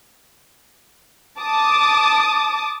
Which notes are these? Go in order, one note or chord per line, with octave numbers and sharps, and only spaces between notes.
A5 D6 D#6